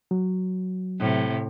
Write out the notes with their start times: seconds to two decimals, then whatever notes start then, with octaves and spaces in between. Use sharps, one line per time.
0.11 F#3
0.99 A2 C3